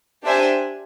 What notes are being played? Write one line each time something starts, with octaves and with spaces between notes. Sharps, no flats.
D4 G4 C5 E5 G#5